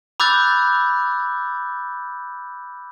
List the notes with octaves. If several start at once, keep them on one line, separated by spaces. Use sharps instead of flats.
B5 D6 E6 F#6 G6 A6